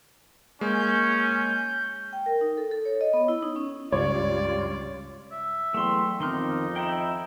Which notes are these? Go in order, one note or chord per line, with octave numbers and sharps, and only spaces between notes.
G#3 A#3 C#4 G6
G5
A#4
D#4
A4
A4
C#5
D#5
B3
E4
D#4
C#4
C#2 G2 G3 F4 C#5 D5
E5
E2 F#3 A3 G5 C6
F2 D#3 B3 C4 D#4 C6 D6 F6
E4 D#5 G5 A#5